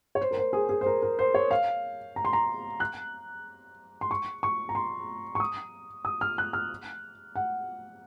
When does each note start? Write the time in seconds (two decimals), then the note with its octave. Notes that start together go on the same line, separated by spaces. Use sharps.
0.15 C#5
0.21 C5
0.31 A#4
0.37 C5
0.53 G#4
0.69 G#4
0.81 C5
0.86 A#4
1.03 A#4
1.19 C5
1.34 C#5
1.51 F5
2.16 A#5
2.25 C6
2.33 A#5
2.80 F#6
4.01 C6
4.11 C#6
4.43 C#6
4.69 A#5
4.75 C6
5.35 C#6
5.40 D#6
6.05 D#6
6.21 F6
6.38 F#6
6.53 F6
7.36 F#5